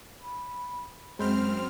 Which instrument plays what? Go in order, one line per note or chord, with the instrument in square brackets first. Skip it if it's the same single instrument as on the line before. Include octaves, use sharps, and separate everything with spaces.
[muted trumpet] B5
[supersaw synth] F#2 C4 F6 [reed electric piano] G#3 B5 G6 [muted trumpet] C5